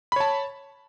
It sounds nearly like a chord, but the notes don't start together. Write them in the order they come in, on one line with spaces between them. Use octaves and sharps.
B5 C#5 A5